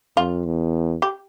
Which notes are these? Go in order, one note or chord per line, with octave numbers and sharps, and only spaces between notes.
F2 F4
E2
G4